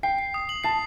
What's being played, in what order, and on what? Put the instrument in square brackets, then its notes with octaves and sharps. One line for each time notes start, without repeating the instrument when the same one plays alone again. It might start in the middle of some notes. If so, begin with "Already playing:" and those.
[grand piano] G5 [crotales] C7
[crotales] C7
D#6
F#7
[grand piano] A5 [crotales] C7